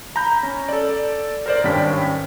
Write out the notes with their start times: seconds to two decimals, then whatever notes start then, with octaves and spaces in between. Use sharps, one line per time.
0.16 A#5 B5 G6
0.43 C#4
0.69 A4 D5
1.46 A#4 C5 D5
1.63 G#1 G2 C#4 D4 G5 B6